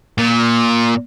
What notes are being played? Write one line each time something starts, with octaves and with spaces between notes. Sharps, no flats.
A#2